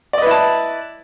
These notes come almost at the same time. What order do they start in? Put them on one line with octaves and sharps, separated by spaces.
D5 D#5 B4 E4 A5